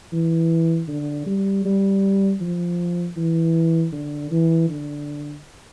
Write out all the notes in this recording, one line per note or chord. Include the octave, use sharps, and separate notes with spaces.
E3
D3
G3
G3
F3
E3
D3
E3
D3